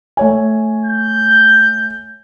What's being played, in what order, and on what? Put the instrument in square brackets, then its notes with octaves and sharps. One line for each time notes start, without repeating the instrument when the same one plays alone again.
[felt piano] A3 C#5 G#5
[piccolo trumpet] G6